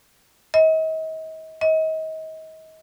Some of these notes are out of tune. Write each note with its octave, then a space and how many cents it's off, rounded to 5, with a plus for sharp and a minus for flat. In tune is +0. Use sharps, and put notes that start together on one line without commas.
D#5 +40
D#5 +35